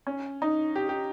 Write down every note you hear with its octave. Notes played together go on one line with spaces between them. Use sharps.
C#4
D#4
G4
G4